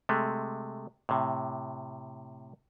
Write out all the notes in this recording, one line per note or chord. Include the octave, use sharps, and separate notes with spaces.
C3 G#3 A3
A2 C3